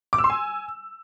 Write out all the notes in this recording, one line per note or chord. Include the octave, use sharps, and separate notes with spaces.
D6
E6
C6
G#5